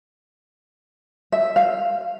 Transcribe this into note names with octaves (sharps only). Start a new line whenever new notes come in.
E5
F5